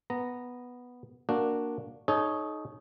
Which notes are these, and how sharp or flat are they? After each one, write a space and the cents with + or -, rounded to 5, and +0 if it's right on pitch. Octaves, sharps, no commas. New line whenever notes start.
B3 +0 A#5 +0
A#3 +0 D4 +0 F#4 +0
D#4 +0 A4 -45 C#5 +0